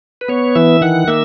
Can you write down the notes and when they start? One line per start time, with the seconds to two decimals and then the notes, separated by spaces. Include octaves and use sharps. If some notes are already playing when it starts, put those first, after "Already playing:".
0.21 B4
0.28 B3 C#5
0.55 E3 E5
0.81 D#3 F#5
1.08 A#3 E5